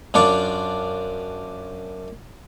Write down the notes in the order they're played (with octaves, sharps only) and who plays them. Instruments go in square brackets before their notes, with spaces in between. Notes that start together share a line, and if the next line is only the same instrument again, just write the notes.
[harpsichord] F#2 D4 F4 D5 C#6